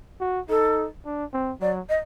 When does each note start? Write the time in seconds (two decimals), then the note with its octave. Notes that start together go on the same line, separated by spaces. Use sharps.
0.21 F#4
0.49 D#4 A4
1.05 D4
1.33 C4
1.61 F#3 D5
1.89 D#5